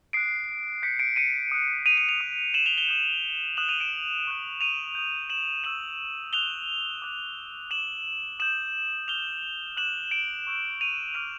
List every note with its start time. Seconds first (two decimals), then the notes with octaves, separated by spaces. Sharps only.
0.13 D#6 F#6 C7 D7
0.82 D#6 G6 B6 C#7
0.99 C7 D7
1.16 C#7 D#7
1.52 D#6 F#6
1.86 D#7 F7
1.97 D#7 F7
2.09 D#7 F7
2.20 D#6 F#6
2.54 E7 F#7
2.66 F7 G7
2.77 F7 G7
2.88 D#6 G6
3.57 D#6 F#6 E7 F#7
3.69 D#7 F7
3.80 D7 E7
4.27 C#6 F#6
4.61 D#7 F7
4.95 D#6 G6
5.30 E7 F#7
5.64 C#6 E6 G6 E7 F#7
6.33 D#6 F#6 F7 G7
7.02 D6 F#6
7.70 D6 F#6 E7 F#7
8.40 D#6 G6 E7 F#7
9.08 D6 F6 F7 G7
9.77 D6 F#6 E7 F#7
10.11 D7 E7
10.47 C#6 E6 G6
10.81 D#7 F7
11.14 D6 F6 D#7 F7